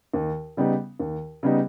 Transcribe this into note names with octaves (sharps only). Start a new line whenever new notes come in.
D#2
C#3 G3 B3 D#4
D#2
C#3 G3 B3 D#4